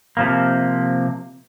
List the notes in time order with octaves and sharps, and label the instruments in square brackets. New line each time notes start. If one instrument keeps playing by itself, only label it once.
[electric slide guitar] C3 F3 A#3